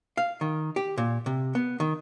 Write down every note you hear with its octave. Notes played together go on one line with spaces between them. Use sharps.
F5
D#3
G4
A#2
C3
B3
D#3